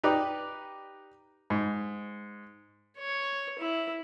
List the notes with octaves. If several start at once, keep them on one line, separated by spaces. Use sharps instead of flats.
D#4 G4 B4 D5
G#2
C#5
E4